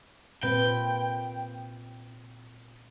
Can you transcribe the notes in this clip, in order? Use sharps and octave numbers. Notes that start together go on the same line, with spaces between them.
A#2 C4 B4 G5